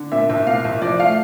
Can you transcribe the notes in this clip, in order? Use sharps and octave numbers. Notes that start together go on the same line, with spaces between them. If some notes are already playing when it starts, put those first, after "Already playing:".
Already playing: D3
A#2 E5
C2 E5
A#2 F5
C2 E5
F3 D5
A3 F5